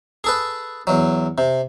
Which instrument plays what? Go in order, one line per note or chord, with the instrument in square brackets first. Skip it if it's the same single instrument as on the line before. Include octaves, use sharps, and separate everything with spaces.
[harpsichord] G#4 A4 B4
E2 F#3
C3